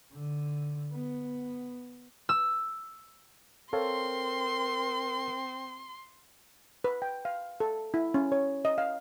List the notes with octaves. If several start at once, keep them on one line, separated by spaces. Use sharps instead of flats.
D3
B3
E6
C4 A4 A#4 C#5 F5 C6
B4
G5
F5
A4
E4
C#4
C#5
D#5
F5